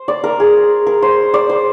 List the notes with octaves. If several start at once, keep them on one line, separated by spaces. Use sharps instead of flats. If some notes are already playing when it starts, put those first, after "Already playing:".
Already playing: C5
D5
A#4
G#4
A#4
C5
D5
C5